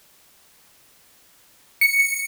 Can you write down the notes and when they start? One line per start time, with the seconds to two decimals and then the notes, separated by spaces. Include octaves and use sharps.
1.81 C#7